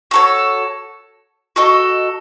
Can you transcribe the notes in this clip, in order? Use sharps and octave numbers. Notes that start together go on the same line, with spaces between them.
F#4 A4 C#5
F#4 A4 D#5